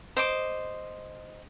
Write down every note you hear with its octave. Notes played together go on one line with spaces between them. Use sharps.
C5 D#5 D6